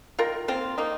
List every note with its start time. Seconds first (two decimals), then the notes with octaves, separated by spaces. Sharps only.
0.19 D#3 F4 A#4
0.48 A#3 C4 F4
0.78 A#3 D#4